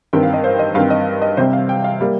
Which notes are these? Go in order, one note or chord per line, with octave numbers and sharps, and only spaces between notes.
G2 D#3 C4 G5
F5
D#5
C5
D#5
G2 D#3 C4 F5
D#5
D#5
C3 G3 C4 C5
F5
G5
F5
G3 A#3